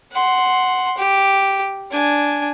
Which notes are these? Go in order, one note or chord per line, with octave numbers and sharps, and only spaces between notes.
F#5 C6
G4
D4 G#5